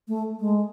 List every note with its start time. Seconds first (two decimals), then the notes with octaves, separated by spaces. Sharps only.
0.08 A3
0.40 G#3